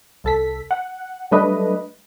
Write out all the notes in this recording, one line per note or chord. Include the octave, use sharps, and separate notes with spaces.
C2 A4 B6
F#5
F#3 G3 A3 D4 B4 D#5